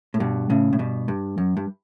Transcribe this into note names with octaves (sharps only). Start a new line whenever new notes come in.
A2
G2 B2
A2 C#3
A2
G2 B2
G2
F#2
G2